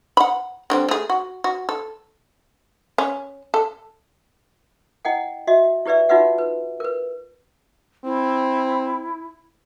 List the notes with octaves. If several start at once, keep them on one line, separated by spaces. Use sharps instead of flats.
F#5 B5
D3 G3 C4
A3 G#4
F#4
F#4
A4
C#4
A4
E4 D#5 F#5 G5
F#4 D#5 E5
E4 G4 B4 D5 E5
D#4 F4 F#4 B4 E5 F#5
B4
A#4 B4
C4 E4